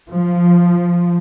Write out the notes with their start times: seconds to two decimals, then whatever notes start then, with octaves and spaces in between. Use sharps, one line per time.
0.11 F3